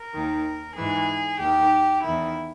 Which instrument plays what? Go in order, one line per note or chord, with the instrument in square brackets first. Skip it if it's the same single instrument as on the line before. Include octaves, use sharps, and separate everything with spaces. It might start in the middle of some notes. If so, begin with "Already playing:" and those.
Already playing: [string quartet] A#4
D#2 D#3
G#2 E3 G#4
D#2 D#3 G4
E2 D#3 E4